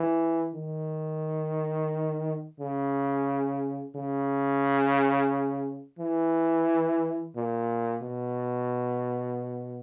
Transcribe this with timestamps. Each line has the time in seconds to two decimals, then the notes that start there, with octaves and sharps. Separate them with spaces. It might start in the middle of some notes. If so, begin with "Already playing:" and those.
Already playing: E3
0.55 D#3
2.60 C#3
3.96 C#3
5.99 E3
7.36 A#2
8.03 B2